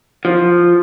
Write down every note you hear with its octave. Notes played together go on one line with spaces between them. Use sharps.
F3